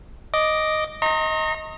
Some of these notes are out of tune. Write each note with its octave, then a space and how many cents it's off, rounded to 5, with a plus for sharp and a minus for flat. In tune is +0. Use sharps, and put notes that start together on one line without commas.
D#5 +0 D6 +0
D#5 +20 A#5 -20 C#6 -45